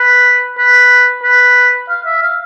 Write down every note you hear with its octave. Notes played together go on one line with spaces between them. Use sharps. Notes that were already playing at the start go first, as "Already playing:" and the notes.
Already playing: B4
B4
B4
F5
E5
F5